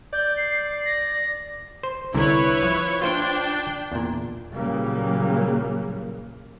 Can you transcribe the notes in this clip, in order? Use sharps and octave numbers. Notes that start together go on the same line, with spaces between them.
D5 G6
C7
A#6
C5
C2 D3 E4 A#4 B4 C#5
F3
D4 F4 C5 F5 G5
E2 A#2
A#2 C#3 E3 F#3 G3 A#3